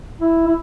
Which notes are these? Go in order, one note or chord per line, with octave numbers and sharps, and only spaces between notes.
E4
E4